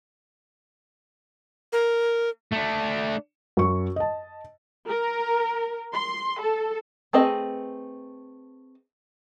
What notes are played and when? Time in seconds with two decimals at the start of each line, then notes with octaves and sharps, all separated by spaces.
1.73 A#4
2.53 A3 D4
3.57 F#2 C#6
3.96 D#5 A5
4.87 A#4
5.93 C6
6.40 A4
7.13 A3 C4 G#4 B4 D#5